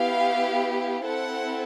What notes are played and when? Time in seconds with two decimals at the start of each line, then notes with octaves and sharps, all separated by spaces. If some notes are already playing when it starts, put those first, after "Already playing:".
Already playing: B3 E4 G4 F5
1.04 C4 E4 A4 F#5